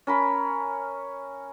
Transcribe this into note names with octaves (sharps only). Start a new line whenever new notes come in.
C#4 A#4 B5